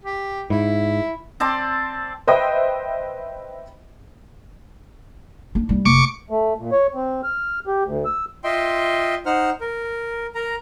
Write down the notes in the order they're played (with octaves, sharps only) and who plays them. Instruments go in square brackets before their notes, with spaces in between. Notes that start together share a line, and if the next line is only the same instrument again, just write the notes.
[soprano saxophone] G4
[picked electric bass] G#2 [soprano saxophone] E4
[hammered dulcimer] C4 D5 A5 C6
[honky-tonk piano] B4 C5 D#5 E5 G5
[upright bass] D4
G3 D4
[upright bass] F1 [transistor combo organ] C#6 D6
[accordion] A3
A#2
C#5
C4
F6
G4
D2
E6
[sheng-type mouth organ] F4 D#5 E5 G5 C6
D#4 C5 F#5 F6
A#4
A#4 A#5